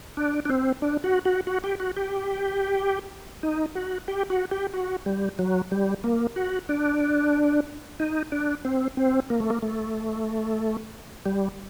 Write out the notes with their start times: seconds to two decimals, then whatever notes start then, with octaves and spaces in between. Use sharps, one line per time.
0.17 D4
0.45 D4
0.50 C4
0.82 D4
1.04 F#4
1.25 F#4
1.47 F#4
1.64 G4
1.80 F#4
1.96 G4
3.43 D#4
3.75 F#4
4.08 G4
4.30 F#4
4.51 G4
4.74 F#4
5.06 G3
5.39 F#3
5.71 G3
6.04 A#3
6.36 F#4
6.69 D4
8.00 D#4
8.32 D4
8.65 C4
8.97 C4
9.30 A#3
9.40 A3
9.50 A#3
9.62 A3
11.26 G3